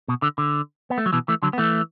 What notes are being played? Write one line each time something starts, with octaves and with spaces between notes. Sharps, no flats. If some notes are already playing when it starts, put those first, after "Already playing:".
B2
D3
D3
B3
A3
F#3
B2 E3
E3 A3
D3 F#3
B3
E3 A3